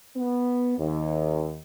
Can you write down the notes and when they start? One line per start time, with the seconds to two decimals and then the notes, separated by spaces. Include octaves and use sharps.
0.16 B3
0.78 D#2